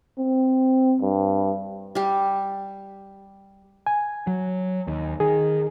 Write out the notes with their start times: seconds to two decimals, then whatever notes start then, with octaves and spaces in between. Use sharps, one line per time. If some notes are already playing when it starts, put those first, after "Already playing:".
0.19 C4
1.01 G2
1.95 G3 G4
3.87 G#5
4.27 F#3
4.87 D#2
5.20 D#3 G#4